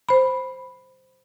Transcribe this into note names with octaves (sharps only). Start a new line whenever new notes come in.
C5 B5